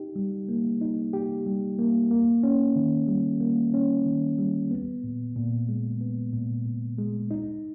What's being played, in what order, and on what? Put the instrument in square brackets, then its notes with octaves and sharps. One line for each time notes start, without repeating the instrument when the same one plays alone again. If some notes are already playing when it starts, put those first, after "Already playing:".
Already playing: [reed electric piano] D#4 G4
G3
A#3
D#4
G4
G3
A#3
A#3
C#4
D#3
G3
A#3
C#4
D#3
G3
B3
A#2
A#2
G#3
B3
A#2
A#2
G#3
D#4